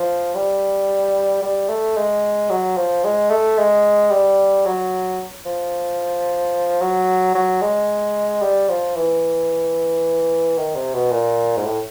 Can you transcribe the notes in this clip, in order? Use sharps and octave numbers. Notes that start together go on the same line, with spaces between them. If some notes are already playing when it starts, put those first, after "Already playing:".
Already playing: F3
G3
G3
A3
G#3
F#3
F3
G#3
A3
G#3
G3
F#3
F3
F#3
F#3
G#3
G3
F3
E3
D#3
C3
B2
A#2
G#2
A2